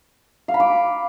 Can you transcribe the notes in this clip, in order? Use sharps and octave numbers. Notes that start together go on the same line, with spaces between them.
F5
B5
D6